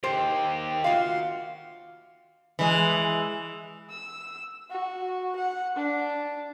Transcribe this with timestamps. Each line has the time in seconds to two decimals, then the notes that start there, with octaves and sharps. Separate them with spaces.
0.03 D#2 G4 C5
0.84 F4 F#4 F5 C6
2.59 E3 G#3
3.90 E6
4.70 F#4
5.36 F#5
5.76 D4